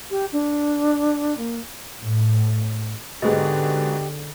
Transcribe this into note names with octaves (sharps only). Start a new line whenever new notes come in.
G4
D4
A#3
A2
G#2 B2 D3 G4 G#4 C5 D#5